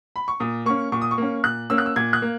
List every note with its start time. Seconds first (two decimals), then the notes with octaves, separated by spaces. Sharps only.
0.16 B5
0.28 C#6
0.40 A#2 D#6
0.66 A#3 C#4 C#6
0.92 A#2 C#6
1.01 D#6
1.11 C#6
1.18 A#3 C#4
1.44 A#2 F#6
1.70 A#3 C#4 E6
1.78 F#6
1.86 E6
1.96 A#2 G#6
2.13 F#6
2.22 A#3